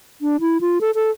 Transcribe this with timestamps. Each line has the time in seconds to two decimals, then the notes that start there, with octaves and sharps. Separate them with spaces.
0.21 D4
0.40 E4
0.61 F4
0.81 A4
0.95 A4